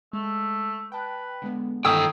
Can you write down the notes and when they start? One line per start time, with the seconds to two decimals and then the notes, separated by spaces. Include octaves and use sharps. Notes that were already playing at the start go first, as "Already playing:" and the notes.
0.13 G#3 A3
0.92 B4 G5 A5 F#6
1.42 D3 G#3 B3
1.85 D#3 E3 D#4 A4 G5 G#5 D#6 E6